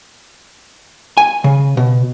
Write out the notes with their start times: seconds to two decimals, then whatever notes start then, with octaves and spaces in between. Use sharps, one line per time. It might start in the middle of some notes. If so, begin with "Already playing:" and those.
1.17 G#5
1.44 C#3
1.77 B2